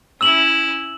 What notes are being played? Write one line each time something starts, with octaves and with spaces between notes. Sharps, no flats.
C#4 E4 E6 E7 F#7